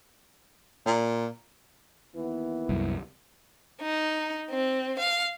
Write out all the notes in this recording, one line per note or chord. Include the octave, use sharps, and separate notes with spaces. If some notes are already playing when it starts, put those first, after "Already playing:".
A#2
D#2 E3 B3
C2 F#2
D#4
C4
F5